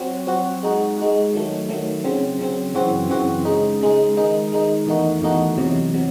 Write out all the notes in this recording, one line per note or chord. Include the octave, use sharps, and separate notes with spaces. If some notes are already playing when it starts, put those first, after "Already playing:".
Already playing: F#3 C4 F#4
F#3 C4 F#4
G#3 D#4 F#4
G#3 D#4 F#4
D#3 F#3 A3
D#3 F#3 A3
C#3 F#3 C4
C#3 F#3 C4
F#2 C#3 E3 C4 F#4
F#2 C#3 E3 C4 F#4
C#3 G#3 D#4
C#3 G#3 D#4
D#3 G#3 D#4
D#3 G#3 D#4
E2 D#3 A3 D#4 F#4
E2 D#3 A3 D#4 F#4
E2 C3 F#3
C3 F#3